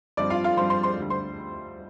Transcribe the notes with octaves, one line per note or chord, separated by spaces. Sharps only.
G2 F3 C4 D5 D6
F4 F5
F4 F5
G2 F3 C4 C5 C6
C5 C6
C5 C6
D2 D3 G3
C5 C6